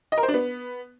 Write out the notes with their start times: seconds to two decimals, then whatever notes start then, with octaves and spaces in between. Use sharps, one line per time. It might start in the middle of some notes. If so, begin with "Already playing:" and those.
0.12 D#5
0.18 A#4
0.23 C5
0.28 D4
0.34 B3